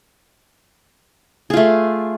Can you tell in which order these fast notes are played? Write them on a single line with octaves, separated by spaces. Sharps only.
G#4 F4 A3